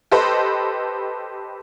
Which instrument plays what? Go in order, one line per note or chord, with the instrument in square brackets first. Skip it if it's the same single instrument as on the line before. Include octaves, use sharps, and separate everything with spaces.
[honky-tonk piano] G4 A4 B4 C5 D#5